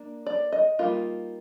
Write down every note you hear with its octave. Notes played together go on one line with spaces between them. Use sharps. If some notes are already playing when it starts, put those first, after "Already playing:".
Already playing: A#3 D4
D5
D#5
G3 A#3 D#4 F4